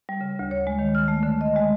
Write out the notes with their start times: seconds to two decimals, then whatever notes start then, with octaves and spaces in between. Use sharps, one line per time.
0.09 G3
0.21 C#3
0.39 D2
0.51 C#5
0.67 G#3
0.79 D#3
0.95 F6
1.08 A3
1.23 D3
1.41 D#5
1.56 G#3